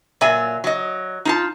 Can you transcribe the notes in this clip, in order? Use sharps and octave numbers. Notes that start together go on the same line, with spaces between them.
A#2 F#3 E5 G#5
F#3 D#5
D#4 F4 A5